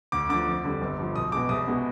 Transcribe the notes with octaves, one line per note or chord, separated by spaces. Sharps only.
D2 D6
D3 F3 D6
F2
D3 G3
G1
G2 F3
B1 D#6
B2 G#3 D6
C2 D#6
B2 G#3